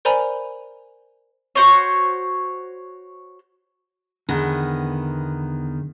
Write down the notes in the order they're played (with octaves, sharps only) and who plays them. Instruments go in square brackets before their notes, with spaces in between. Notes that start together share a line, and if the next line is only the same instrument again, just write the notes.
[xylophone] A#4 C5 D5 G#5 A#5 B5
[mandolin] F#4 C5 C#5
[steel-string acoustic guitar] E2 D#3 B3 [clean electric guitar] D3